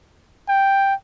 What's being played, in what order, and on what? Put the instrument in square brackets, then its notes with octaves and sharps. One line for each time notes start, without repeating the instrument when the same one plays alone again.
[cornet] G5